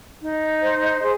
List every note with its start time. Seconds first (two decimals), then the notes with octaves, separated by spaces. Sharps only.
0.22 D#4
0.61 C5
1.00 G#4